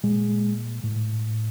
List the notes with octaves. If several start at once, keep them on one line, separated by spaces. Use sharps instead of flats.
A#2 G#3
A2